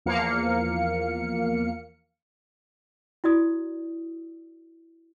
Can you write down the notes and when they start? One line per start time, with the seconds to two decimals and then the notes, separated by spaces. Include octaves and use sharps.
0.06 E2 F3 A#3 F5 C#7
3.24 E4 F#4 D5 D#6